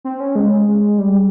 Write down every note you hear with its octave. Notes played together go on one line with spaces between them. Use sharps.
C4
C#4
G#3
G3